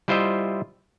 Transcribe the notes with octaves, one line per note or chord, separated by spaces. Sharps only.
G3 E4 F4 C5 D#5 E5